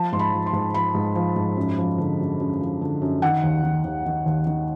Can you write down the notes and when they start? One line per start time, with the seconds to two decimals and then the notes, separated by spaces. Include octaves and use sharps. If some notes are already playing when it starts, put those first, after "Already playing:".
Already playing: F3 A5
0.12 G#2 C6
0.19 B5
0.33 F3
0.46 C6
0.53 G#2
0.74 F3 B5
0.95 G#2
1.15 F3
1.36 G#2
1.57 F#2
1.78 F3
1.98 D3
2.19 F#2
2.40 F#2
2.61 F3
2.81 D3
3.02 F#2
3.22 D#3 F#5
3.43 D#2
3.63 D#3
3.84 D#2
4.06 D#3
4.26 D#2
4.47 D#3